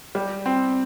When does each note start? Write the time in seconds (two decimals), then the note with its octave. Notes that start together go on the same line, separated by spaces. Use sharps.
0.15 G3
0.46 C4